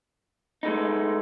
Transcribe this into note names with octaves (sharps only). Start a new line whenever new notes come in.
G#3 A3 B3 D#4